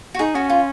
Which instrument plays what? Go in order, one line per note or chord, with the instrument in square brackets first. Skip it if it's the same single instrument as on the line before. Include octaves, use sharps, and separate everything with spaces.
[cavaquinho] F#4
[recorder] D#4 [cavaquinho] G#4
[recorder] C#4 [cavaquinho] F#4
[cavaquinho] F4